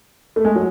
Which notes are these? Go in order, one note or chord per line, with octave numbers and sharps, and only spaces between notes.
A3
G#3
F#3